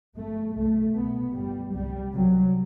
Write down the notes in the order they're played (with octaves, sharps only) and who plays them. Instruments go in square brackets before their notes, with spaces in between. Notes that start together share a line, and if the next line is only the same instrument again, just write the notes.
[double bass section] G1 G2 A3
C2 B2 A3
C2 B2 B3
G1 G2 G3
C2 C3 G3
C2 C3 F#3